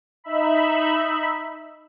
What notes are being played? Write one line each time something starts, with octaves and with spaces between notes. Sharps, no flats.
D#4 E5 B5